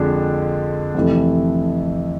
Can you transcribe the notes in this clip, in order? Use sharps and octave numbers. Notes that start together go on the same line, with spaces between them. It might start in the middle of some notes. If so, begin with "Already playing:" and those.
Already playing: F2 D3 F3 G#3 D4
F2 C3 E3 A3